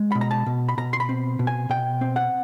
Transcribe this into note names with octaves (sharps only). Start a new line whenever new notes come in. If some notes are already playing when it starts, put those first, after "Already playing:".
Already playing: G#3
B2 B5
A#5
A5
B2
B5
B2 A#5
C6
B5
C4
B2
G#5
B2 G5
C4
F#5